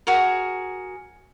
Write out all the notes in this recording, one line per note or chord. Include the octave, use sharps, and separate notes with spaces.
F#4 G#4 A#4